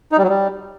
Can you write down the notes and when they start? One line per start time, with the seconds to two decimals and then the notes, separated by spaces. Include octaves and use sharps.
0.12 D#4
0.18 G3
0.23 F#3
0.29 G3